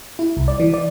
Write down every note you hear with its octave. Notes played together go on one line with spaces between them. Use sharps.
E4
C2
D5
E3
D5